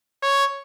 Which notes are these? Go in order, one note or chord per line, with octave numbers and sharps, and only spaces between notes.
C#5